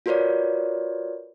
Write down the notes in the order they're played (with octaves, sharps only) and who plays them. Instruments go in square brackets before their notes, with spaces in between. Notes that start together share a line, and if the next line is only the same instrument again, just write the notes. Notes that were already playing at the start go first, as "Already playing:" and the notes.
[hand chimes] F4 F#4 A#4 B4 C#5 D5